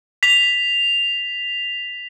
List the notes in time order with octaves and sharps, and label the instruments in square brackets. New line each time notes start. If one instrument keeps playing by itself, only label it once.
[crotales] B6 F7